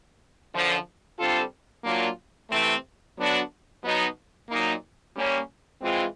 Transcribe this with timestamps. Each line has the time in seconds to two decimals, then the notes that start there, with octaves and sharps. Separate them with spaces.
0.52 F#2 D3 F3
1.17 D3 G3 C4 F4 A4
1.84 A#2 F#3 A#3 D4 F4
2.50 C3 E3 A3 C4
3.17 D3 F#3 B3 D4 F#4
3.82 B2 F#3 B3 D#4
4.49 A#2 F#3 A#3 D#4
5.15 G3 A#3 C#4
5.81 E3 G#3 C4 F4